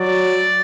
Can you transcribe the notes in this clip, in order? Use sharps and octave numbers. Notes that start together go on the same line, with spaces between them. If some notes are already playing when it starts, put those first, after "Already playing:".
Already playing: F#3 D5